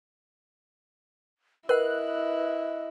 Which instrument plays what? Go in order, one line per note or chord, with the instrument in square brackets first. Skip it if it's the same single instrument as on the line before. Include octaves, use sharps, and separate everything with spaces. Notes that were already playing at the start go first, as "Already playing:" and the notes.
[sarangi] E4 [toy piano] A#4 F#5 [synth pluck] B4 F#6 [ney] D#5